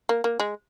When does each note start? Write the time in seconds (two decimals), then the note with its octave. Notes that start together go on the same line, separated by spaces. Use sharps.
0.09 A#3
0.24 A#3
0.40 G#3